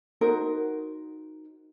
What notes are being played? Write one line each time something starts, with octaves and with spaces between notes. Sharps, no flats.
D#4 F#4 A#4 C5